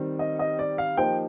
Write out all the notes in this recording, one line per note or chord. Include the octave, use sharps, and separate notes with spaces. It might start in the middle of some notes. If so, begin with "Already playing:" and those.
Already playing: D#3 G3 C4
D#5
D#5
D5
F5
F3 A#3 D#4 G4 C5 G5